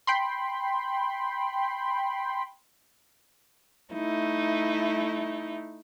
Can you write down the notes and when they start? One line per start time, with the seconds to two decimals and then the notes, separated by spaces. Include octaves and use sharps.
0.07 G5 B5 C6
3.93 A3 D#4 E4